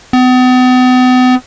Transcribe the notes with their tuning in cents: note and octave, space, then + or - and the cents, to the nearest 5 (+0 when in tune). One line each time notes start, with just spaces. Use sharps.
B3 +40